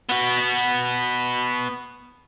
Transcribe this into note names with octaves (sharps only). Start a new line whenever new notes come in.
B3 F#4